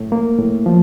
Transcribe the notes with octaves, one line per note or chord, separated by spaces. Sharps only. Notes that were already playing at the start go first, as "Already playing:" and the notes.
Already playing: A2
A#3
A2
F3